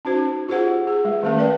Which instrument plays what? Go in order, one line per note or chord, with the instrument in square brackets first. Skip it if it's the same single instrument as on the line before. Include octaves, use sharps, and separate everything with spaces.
[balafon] C#4 D#4 F#4 C5
F4 G4 G#4 C5 F#5
G#4
G#3
D#3 G#3 A3 C#4 A#4
B4 D5 G5